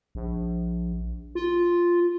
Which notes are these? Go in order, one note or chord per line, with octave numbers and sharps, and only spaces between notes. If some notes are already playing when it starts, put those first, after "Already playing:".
A#1
F4